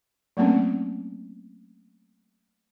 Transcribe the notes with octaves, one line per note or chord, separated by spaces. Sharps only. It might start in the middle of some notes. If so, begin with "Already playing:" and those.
F#3 A3 A#3 C4 C#4